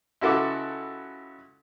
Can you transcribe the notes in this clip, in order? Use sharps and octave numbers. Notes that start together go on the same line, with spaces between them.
C#2 E4 F#4 A4 E5 D6